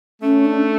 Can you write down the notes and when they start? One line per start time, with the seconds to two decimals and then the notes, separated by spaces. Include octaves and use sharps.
0.22 A3 C#4
0.45 D4